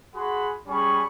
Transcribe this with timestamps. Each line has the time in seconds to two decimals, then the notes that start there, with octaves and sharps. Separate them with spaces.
0.14 F#4 G#4 F#5 B5 C6
0.67 G3 C#4 G#4 B5 C#6